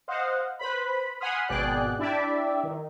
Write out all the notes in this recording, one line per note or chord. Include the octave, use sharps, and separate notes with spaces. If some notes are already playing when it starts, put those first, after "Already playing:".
C5 D#5 F5 F#5
B4 C5 B5
F#5 G#5 B5 C6 D#6 F6
G#1 B2 G#4 D5 G5 F#6
D4 E4 G4 D5 E5
D#3